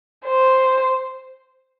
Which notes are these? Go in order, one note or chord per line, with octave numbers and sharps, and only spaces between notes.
C5